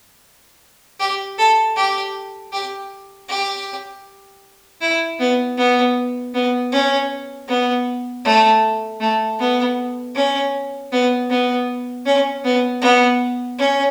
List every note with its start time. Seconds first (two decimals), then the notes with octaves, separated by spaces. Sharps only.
1.00 G4
1.38 A4
1.77 G4
2.53 G4
3.29 G4
4.81 E4
5.19 B3
5.58 B3
6.34 B3
6.72 C#4
7.48 B3
8.25 A3
9.01 A3
9.39 B3
10.15 C#4
10.92 B3
11.30 B3
12.06 C#4
12.44 B3
12.82 B3
13.58 C#4